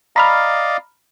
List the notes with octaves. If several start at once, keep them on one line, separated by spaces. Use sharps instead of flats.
D5 D#5 F5 A#5 B5 F6